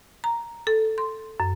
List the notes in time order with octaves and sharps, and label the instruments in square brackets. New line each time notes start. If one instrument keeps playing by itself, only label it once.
[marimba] A#5
A4
C6
F#2